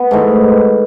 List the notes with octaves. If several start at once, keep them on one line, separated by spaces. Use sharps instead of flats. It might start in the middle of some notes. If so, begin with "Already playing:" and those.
Already playing: B3
G#2 E3 A3